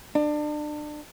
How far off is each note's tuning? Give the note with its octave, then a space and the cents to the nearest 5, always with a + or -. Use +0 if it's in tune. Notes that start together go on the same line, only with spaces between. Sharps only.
D4 +30